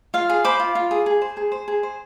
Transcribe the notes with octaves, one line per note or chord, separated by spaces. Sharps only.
F4 F5
G#4
C5 B5 D6
F4
F4
G#4
G#4
C5
G#4
C5
G#4
C5